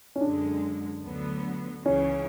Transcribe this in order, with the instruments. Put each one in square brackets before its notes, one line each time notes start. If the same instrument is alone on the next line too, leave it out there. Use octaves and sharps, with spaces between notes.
[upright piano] C#4
[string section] F#2 D3 G#3 [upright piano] D4
[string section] D2 D3 F#3 B3
[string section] C#2 C#3 E3 [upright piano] C#4